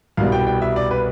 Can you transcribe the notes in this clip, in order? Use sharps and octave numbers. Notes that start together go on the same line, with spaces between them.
C2 B2 G3 F5
G5
G5
E5
D5
B4